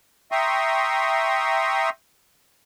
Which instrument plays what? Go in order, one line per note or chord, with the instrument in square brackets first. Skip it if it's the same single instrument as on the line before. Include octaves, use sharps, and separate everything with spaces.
[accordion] E5 G5 A#5 C6 C#6 D#6